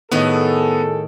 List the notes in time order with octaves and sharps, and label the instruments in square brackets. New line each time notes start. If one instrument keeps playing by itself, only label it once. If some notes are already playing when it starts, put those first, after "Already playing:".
[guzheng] A2 D#3 F#4 [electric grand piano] B3 D#5 [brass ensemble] G#4 A4